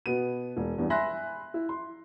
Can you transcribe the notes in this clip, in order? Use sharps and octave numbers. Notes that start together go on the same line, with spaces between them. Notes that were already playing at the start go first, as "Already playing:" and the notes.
B2 B3 D#7
E1
E2 G2
E5 G#5 B5 C6 F#6 A#6
E4
C6